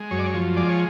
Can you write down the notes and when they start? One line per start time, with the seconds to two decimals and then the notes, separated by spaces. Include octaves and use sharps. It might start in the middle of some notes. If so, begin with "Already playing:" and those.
Already playing: G#3
0.11 F#2 C#5
0.19 D5
0.26 C#5
0.34 F3
0.56 G#3 D5
0.69 C#5